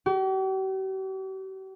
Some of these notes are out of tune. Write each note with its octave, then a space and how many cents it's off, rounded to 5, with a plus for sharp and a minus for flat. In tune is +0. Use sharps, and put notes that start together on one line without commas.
G4 -45